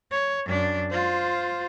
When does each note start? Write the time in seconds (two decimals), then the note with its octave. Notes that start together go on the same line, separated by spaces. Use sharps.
0.11 C#5
0.46 F#2 D4
0.91 F4 C5